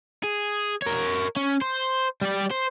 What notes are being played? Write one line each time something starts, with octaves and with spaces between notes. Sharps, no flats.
G#4
A#4 C#5
C#4
C5
G3 D5
C5